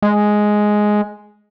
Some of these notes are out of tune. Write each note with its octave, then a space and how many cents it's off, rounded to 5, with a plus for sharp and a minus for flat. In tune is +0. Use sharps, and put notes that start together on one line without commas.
G#3 +5